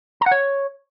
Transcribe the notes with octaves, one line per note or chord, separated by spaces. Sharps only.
A#5
F#5
C#5